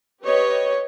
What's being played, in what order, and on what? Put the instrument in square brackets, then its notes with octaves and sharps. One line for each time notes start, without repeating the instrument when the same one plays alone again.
[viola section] G4 B4 C#5 D#5